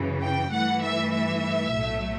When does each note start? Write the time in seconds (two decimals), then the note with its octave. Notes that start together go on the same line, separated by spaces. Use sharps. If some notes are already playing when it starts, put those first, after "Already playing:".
Already playing: F#2 C#3 E3
0.22 G5
0.52 G2 E3 A3 F#5
0.83 E5
1.13 E5
1.73 B1 A2 F#3 A3